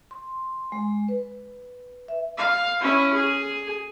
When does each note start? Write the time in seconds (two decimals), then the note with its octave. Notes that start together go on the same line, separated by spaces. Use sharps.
0.11 C6
0.72 G#3
1.08 B4
2.08 E5
2.37 F5
2.82 C#4 E4
3.14 G#4